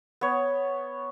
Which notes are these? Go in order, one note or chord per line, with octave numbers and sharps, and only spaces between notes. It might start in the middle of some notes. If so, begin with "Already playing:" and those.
B3 C#5